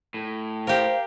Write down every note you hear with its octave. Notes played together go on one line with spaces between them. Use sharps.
A2
G4 A#4 C5 F5